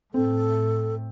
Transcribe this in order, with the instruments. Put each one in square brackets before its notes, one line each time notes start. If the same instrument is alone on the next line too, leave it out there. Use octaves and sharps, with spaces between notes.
[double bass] A2 [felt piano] C4 [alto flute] A4